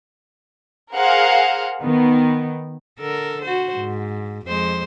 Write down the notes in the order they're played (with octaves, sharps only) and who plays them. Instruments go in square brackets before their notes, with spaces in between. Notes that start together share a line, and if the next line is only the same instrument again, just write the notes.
[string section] G#4 A#4 C5 F5 F#5
D#3 B3
[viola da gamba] D3 A4 A#4
F#4 C5
G#2
F2 G#3 C5